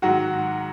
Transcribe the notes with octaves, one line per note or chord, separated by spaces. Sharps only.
G#2 D#3 F#3 F#4 F#5